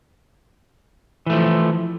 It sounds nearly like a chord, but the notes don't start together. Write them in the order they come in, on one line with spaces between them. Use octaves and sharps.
E3 A3 F3